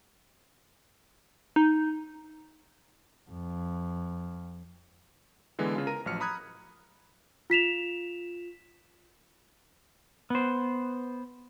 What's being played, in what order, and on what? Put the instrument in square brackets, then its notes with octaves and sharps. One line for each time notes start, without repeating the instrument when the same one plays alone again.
[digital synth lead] D#4
[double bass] F2
[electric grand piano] D3 E3 G#3 B3
C#3 F4
A#4 A#5 D#7
A1 F3 F#3 F6 C#7
A#5 B5 D#6 F#6 G#6
[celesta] F4 B6 E7 F7
[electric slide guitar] B3 C5